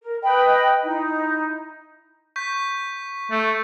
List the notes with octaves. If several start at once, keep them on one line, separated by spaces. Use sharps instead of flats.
A#4
B4 D#5 G5 B5
D#4 E4
C#6 G6 B6
A3